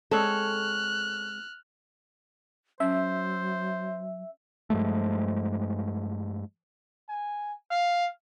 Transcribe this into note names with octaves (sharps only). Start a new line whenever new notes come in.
G#3 C4 A4 C#5 F6 F#6
F#3 C#4 C5 E5
G2 F3 G#3 A3
G#5
F5